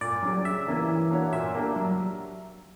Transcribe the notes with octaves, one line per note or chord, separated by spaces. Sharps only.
A#2 D5
F#3 C#4 G4
C#3 E5
E3 A#3 C#4 E4
E3
A#3 D4 F#4 C#5
A#2 E5
A#3 D4 G4
F#3